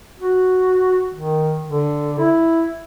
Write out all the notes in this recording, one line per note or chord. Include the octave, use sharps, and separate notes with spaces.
F#4
D#3
D3
E4